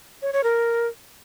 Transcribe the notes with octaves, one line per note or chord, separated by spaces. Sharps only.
C#5
C#5
A#4